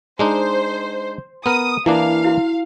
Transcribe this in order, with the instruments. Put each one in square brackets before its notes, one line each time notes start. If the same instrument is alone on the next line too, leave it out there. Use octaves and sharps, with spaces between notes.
[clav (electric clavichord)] G#3 D4 D#4 [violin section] C5
[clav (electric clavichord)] B3 A#4 [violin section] D#6
[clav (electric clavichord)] E3 A#3 D4 [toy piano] E4 [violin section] F5
[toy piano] E4 F#4